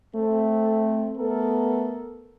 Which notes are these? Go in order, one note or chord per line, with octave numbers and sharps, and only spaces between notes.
A3 C4
A3 B3 A4 A#4